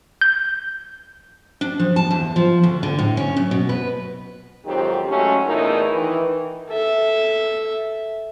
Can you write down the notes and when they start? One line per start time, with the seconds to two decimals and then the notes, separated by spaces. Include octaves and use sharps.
0.21 G6
1.61 D4
1.79 F3
1.96 A5
2.11 E2
2.36 F3
2.63 D2
2.83 D3
2.99 A2
3.17 C#4
3.36 F#2
3.51 B2
3.69 B4
4.65 F2 G#2 D#3 F#3 C4 G4
5.08 F#3 G#3 A3 C#4
5.47 E2 A#2 A3 D#4 E4 A#4
5.92 D#3 E3
6.71 A4 E5